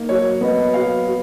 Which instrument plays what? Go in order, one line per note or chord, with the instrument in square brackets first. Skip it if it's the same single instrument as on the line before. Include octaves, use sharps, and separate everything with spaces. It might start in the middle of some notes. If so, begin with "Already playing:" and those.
Already playing: [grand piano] A#3 D#4
F#3 C#5
B3 D#5
F#3 F5
F#3